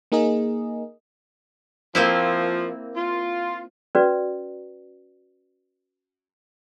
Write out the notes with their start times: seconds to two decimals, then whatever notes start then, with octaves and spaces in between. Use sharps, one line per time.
0.12 A#3 D#4 G#4 A#4 D#5
1.95 F3 A#3 C4 E4
2.96 F4
3.95 C#4 F#4 B4 D5